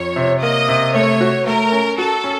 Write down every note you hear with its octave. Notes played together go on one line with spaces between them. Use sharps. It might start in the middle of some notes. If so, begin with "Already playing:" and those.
Already playing: F2 C#5
C3
A#3 D#5
C3
A3 C#5
F#4
A3 A#4
C#4
F#4 A4
C#4